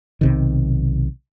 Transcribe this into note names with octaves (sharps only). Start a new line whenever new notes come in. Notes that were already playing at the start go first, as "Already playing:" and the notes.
B1 C3 D#3